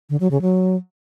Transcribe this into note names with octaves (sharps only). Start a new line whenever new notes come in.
D3
F#3
C#3
F#3